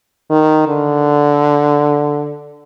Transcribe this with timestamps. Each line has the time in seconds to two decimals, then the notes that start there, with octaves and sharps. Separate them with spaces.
0.30 D#3
0.68 D3